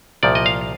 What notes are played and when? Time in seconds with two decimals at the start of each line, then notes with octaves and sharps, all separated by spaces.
0.23 C2 A#2 F3 D5
0.35 D#5
0.46 F5